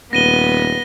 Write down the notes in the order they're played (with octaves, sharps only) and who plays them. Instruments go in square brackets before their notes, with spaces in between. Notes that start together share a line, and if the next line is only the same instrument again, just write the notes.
[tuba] D#1 [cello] B3 [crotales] A#6 D#7 G7